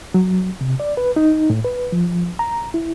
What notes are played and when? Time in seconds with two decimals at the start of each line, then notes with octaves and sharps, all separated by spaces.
0.14 F#3
0.61 C3
0.80 D5
0.97 B4
1.16 D#4
1.50 A2
1.65 B4
1.92 F3
2.39 A#5
2.74 E4